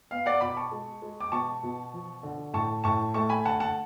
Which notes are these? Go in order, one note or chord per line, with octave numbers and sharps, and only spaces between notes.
B3 F5
D5 F#5
B2 B5 D6
A5 C#6
G#3
G#3
D6
B2 A5 C#6
B2
F3
D3
A2 A5 C#6
A2 A5 C#6
A3 A5 C#6
G#5 B5
D3 F#5 A5
F#5 A5